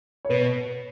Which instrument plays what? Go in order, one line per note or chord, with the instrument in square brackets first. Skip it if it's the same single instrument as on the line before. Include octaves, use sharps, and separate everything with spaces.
[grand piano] C#5
[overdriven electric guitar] B2 [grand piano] B4